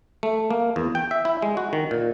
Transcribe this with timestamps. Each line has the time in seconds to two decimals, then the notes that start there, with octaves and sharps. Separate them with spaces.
0.23 A3
0.51 A#3
0.76 E2
0.95 G5
1.11 E5
1.25 E4
1.42 G#3
1.57 F#4
1.73 D#3
1.91 A#2